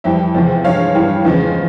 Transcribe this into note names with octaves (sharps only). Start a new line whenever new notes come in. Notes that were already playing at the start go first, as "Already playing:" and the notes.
F2 E3 G3 E5 G5
E2 C3 F3 G#3
G2 F3 G#3 C#5 F5
G2 E3 G3
E2 C#3 F3 G#3